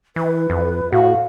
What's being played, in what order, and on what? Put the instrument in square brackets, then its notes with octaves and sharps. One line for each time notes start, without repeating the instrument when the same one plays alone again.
[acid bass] E3 [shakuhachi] B4
[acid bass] F2
[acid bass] A2 [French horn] F#4 [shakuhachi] F5